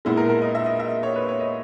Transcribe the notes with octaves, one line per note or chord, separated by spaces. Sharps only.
A#2 G#3 B3 E4
A#4
A#4
D#5
E5
D#5
E5
C#5
B4
C#5
D#5